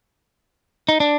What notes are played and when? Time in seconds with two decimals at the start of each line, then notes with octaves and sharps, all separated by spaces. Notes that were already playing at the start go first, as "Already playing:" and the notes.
0.89 D#4
1.00 D4